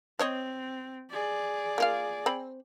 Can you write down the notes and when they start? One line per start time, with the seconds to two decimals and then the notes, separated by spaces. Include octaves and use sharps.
0.19 C4 C5 C#5 D#5
1.11 G#4 D5
1.78 A#3 F4 F5
2.26 C4 B5